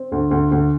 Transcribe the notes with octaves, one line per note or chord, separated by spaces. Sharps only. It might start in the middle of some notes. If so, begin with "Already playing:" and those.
Already playing: C4
D2
D2
D2